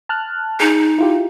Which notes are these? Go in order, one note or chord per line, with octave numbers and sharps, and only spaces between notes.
A5 F6 F#6
D#4 G#4
E4 F4 G4